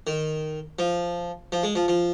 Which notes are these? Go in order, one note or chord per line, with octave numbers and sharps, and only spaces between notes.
D#3
F3
F3
G#3
F3
F3